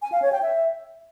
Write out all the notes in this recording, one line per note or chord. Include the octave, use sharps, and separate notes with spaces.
G#5
F5
C#5
G5
E5